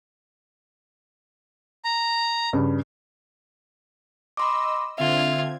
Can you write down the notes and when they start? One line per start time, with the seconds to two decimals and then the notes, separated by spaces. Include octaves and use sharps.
1.85 A#5
2.53 G2 C#3
4.37 D#5 B5 C6 D6 E6
4.98 D3 C4 F4 E5 G#6